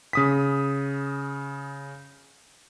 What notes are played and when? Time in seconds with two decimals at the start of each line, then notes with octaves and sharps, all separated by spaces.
0.13 C#3 D#6 B6